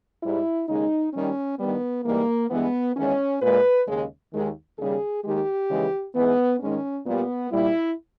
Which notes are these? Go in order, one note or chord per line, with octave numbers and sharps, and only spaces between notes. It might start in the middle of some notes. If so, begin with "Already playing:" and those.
G#2 G3 E4
D#2 C#3 G#3 D#4
D#2 D#3 G3 C#4
G2 D#3 G3 B3
G#2 E3 G3 A#3
G2 E3 G#3 B3
E2 D#3 G#3 C#4
A#2 G#3 B4
D#2 C#3 G#3
D#2 D#3 G#3
D#2 C#3 G3 G#4
D#2 D#3 G#3 G4
D#2 C#3 E3 G#3
G#2 E3 G#3 B3
G#2 D#3 G#3 C#4
A#2 G3 B3
A#2 G3 E4